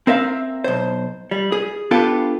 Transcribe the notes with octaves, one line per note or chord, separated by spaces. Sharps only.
C4 A#4 E5 F5
B1 C5
G3
G#4
B3 D4 F4 G4 A4 B4